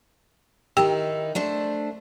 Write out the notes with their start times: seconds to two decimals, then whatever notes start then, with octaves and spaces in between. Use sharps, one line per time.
0.77 D#3 D#4 E4 G4 G5
1.35 A3 D4 C5